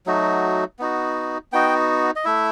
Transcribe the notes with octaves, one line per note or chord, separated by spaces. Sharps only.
F#3 A3 D#4 F#4
B3 D#4 F#4
B3 D#4 F#4 G5
D#5
A3 E4 E5